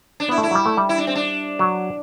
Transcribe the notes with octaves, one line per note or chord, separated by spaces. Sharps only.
D4
B3 E4
A3
E4
F#3
G3
A3
G3
E4
D4
C4
D4
F#3